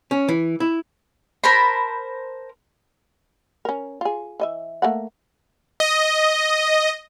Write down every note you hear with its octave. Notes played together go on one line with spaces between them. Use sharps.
C#4
E3
E4
A#4 C5 A5 B5
C#4 A#4
F4 G#4
E3 D#5 E5
A3 A#3 F#5
D#5